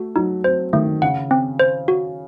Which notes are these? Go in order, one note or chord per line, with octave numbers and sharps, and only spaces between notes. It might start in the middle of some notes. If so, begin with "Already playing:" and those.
Already playing: A3 F#4
F#3 D#4
C4 C5
D#3 A3
C#3 F#5
C4
C5
F#4